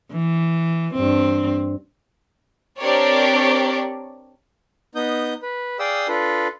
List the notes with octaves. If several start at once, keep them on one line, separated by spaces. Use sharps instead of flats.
E3
G2 C4
C4 D4 G4 A#4 C#5 D5
B3 D#4 D#6 G6
B4
G#4 D5 F5 G5 D#6 E6
D4 F4 A4 B4